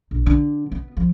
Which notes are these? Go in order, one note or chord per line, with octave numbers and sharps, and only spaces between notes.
A#1
D3
B3
F3